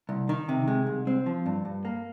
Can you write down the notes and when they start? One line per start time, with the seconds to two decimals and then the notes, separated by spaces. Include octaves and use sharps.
0.09 C2
0.29 D#3
0.49 C3
0.68 G#3
0.86 C2
1.07 C4
1.26 F3
1.46 G2
1.65 G2
1.85 A#3